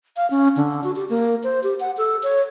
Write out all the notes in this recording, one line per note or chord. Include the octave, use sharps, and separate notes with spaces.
F5
C#4
D3
F#4
G4
A#3
C5
G4
F#5
A4
C#5